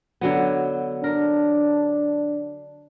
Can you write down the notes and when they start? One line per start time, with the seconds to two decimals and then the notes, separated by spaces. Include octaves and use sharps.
0.21 D3 F#3 B3
1.04 D4 A#4